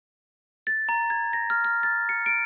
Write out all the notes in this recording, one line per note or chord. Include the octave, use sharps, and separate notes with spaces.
A6
A#5
G#6
A#6
F6
F6
A6
C#7
D7